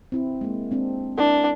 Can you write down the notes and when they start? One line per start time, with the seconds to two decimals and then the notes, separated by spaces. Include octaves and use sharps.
0.12 C4 E4
0.41 G#3 A#3
0.71 G#3 C4 D4
1.18 D4 E4 A#4